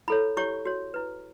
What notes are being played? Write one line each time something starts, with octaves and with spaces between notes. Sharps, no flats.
E4 A4 C#5 B5
E4 G4 C#5 C#6
F#4 C#5
E4 B4